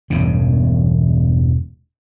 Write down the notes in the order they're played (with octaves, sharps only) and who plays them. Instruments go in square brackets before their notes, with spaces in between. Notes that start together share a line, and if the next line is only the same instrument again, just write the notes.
[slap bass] E1 E2 G2 C#3